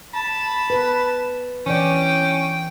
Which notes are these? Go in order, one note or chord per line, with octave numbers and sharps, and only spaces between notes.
A5 B5
B4
E3 C#4 D5 G5